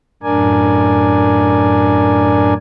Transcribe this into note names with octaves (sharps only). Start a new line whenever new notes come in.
F#2 A2 D4 A#4 D5 G#5